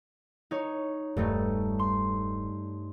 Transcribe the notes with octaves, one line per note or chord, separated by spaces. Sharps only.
D#4 C#5
E1 G2 A3 D#4
C6